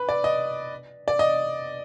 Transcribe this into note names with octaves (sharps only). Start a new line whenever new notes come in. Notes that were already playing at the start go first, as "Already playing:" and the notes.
Already playing: B4
D5
D#5
D5
D#5